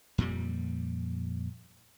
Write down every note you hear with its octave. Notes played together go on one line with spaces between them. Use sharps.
F2 A#2 G3